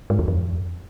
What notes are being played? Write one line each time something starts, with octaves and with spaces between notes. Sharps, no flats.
G#2
E2
F2